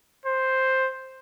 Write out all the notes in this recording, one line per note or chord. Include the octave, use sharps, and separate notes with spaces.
C5